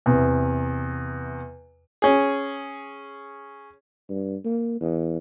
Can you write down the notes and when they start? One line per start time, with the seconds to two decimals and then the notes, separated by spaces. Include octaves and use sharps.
0.06 E2 C3
2.02 C#4 G#4
4.09 G2
4.44 A#3
4.80 E2